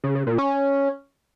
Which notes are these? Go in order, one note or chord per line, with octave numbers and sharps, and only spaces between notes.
C#3
C#3
A#2
C#4